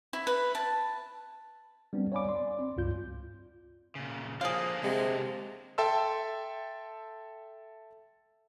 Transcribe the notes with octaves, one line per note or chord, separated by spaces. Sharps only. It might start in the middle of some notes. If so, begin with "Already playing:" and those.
E4
B4
A5
G3 B3 C4 D4
C#5 D5 F5 G#5 B5 D6
D5 C6
C4
C#2 G2 F4 G6
A#2 C#3
D3 F3 A#3 G#4 F5
C3 G#3
A4 E5 G5 A5 C6 E6